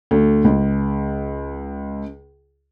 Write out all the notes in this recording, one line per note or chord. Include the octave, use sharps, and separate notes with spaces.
D2
C#2